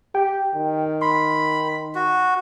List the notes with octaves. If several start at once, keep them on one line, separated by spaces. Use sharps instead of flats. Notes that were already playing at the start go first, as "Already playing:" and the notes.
G4 G5
D#3
B5 C6
F#4